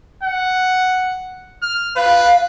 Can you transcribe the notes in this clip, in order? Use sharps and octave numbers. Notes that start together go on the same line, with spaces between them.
F#5
F6
B4 F5